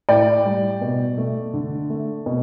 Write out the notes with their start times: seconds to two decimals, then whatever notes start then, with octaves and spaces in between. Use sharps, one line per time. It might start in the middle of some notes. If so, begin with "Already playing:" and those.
0.09 A2 D5 G5
0.45 G3
0.82 B2
1.18 A3
1.54 D3
1.90 A3
2.26 B2